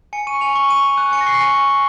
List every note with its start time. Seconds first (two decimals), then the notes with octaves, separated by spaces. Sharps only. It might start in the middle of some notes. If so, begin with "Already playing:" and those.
0.13 G#5 C#7
0.27 C#6 D#7
0.41 G#5 F7
0.56 C#6
0.69 C#6 D#7
0.83 C#6
0.98 F#6 D#7
1.12 G#5 C#7
1.21 A#6
1.26 C#6 C7
1.41 G#5
1.55 C#6
1.69 C#6